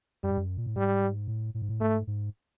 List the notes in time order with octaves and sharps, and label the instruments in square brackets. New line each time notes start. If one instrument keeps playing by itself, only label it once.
[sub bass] F#2 [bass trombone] G3
[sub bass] G2
F#2
A#2
A2
[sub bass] G#2 [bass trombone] G3
[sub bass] A2
A2
G#2
A2
[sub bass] G#2 [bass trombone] A3
[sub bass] G#2